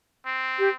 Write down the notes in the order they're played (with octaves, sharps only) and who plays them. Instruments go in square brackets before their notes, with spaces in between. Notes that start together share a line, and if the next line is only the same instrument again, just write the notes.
[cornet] C4
[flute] G4